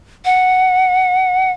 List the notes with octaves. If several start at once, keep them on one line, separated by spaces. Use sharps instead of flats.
F#5